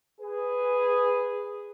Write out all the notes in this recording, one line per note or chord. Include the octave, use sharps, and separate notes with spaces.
G#4 B4